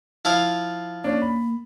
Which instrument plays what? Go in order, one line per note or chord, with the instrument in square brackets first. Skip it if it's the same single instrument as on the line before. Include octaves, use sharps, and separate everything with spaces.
[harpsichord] F3 E4 F5
[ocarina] A#3 [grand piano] C#4 D4
[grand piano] B5